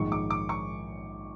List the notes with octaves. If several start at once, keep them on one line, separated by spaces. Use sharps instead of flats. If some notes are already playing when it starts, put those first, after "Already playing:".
Already playing: A#1 G#2 D#3 C#6
D6
D6
C#6